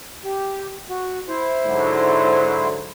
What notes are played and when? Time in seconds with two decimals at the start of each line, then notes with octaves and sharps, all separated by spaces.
0.25 G4
0.90 F#4
1.28 E4 C5
1.66 G#2 D3 F#3